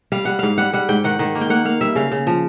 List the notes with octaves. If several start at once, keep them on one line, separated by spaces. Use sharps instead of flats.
G3 F5
G3 F#5
G#2 F5
G3 F#5
G3 F#5
G#2 G5
D#3 F#5
D#3
A#3
G5
A#3 F#5
A#3 F5
G3 E5
C#3 F5
C#3
F3